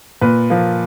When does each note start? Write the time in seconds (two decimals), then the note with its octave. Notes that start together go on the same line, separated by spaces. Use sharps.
0.21 A#2 B4
0.50 F3 A#3